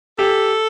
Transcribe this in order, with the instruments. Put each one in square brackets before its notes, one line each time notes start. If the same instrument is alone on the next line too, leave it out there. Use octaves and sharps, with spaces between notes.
[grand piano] G4 [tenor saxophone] A4